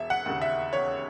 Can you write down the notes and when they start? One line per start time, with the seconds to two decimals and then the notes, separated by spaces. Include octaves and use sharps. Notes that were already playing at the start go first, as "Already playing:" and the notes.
Already playing: E1 E5
0.10 F#5
0.26 D#2 C#3
0.42 E5
0.73 E1 C#5